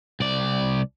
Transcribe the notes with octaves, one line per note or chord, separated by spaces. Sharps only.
C2 D5